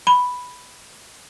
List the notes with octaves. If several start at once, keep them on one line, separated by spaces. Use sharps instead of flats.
B5